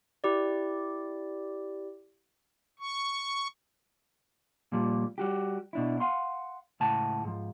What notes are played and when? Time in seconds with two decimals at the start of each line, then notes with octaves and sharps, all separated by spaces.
0.24 E4 G4 D5
2.79 C#6
4.72 A#2 F3 G3
5.18 G3 F#4 G4
5.73 B2 D4 E4
6.00 F5 F#5 C6
6.80 C#2 A2 F#5 A5
7.25 G#2 F3